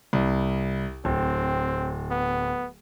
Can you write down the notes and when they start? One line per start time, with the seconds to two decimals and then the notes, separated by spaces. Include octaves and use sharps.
0.13 C2
1.05 D1 C4
2.10 B3